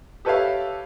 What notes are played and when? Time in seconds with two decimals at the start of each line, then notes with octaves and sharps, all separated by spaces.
0.25 G4 A4 B4 C#5 E5 F5